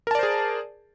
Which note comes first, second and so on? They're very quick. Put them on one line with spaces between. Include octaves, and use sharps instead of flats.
A#4 A5 D5 C5 G#4